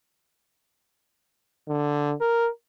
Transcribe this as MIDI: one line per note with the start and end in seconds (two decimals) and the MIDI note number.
1.68 2.14 50
2.21 2.49 70